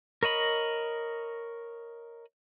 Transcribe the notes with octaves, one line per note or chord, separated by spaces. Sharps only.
A#4 C#5 D#5 B5